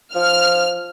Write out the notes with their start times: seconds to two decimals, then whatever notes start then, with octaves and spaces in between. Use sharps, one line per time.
0.15 F3 F6